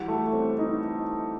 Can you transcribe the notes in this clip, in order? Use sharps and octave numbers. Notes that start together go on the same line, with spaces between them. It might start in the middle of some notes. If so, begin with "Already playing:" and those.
Already playing: E3 G3 F#4
A3
C4
D#4